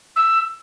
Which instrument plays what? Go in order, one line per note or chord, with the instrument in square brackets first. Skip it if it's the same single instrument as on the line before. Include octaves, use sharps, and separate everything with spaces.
[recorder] E6